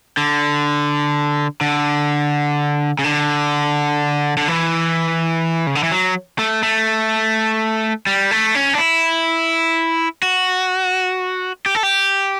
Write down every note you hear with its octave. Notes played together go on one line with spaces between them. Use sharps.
D3
D3
C#3
D3
D3
E3
C#3
D3
E3
F#3
A3
A3
G3
A3
C#4
D4
E4
F#4
G4
A4
G4